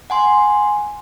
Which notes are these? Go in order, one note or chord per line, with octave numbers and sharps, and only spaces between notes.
F#5 G#5 C6